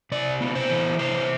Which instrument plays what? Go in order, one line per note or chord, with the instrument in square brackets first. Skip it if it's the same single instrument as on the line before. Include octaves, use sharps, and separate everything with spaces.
[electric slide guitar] C3 D5
B3
C5
E3
C3 C5